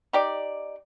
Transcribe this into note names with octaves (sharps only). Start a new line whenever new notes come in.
D#4 G4 D5